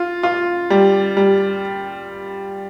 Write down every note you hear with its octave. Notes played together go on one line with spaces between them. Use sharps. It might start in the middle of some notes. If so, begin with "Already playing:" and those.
Already playing: F4
F4
G3
G3